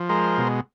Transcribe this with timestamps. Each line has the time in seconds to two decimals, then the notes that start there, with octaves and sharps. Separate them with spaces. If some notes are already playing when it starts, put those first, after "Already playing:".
Already playing: F3
0.09 G#3 A#4 C5
0.38 B2